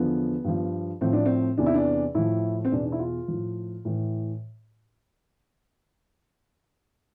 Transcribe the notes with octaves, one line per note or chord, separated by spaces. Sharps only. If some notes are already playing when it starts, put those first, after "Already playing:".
Already playing: E2 D3 F3 B3
G2 F3
A2 F3 C4
D4
C4
E2 C3 E3 D4
E4
D4
A2 F3 E4
C4
E2 B2 D4
D4
E4
F4
A2 F3
A2 E3